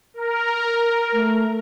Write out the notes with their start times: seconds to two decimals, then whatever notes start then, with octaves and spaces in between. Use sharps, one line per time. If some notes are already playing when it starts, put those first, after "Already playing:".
0.14 A#4
1.13 A3